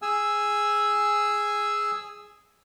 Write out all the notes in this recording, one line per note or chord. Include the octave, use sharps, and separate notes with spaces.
G#4 G#5 E6